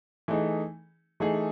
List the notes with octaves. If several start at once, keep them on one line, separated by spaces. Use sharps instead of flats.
E3 A3 D#4 G#4
E3 A3 D#4 G#4